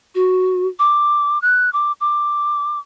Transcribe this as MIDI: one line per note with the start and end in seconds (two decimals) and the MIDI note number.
0.15 0.67 66
0.79 1.40 86
1.42 1.72 90
1.73 1.92 86
2.01 2.79 86